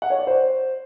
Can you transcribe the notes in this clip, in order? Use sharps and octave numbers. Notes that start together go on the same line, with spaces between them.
F#5
C#5
D5
C5